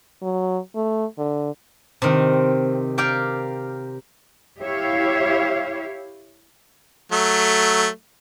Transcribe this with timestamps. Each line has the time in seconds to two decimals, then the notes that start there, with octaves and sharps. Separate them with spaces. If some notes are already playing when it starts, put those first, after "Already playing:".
0.22 F#3
0.76 A3
1.18 D3
2.02 C3 D#3 C4
2.98 G4 A#4 D5 F5 G5
4.61 E4 G4 C#5 E5 F5
7.12 F#3 A3